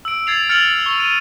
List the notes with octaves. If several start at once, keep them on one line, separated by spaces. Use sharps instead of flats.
E6 D7
G#6 A6 C7 F7
F6 A6 C#7 F7 F#7
C#6 G7
D#7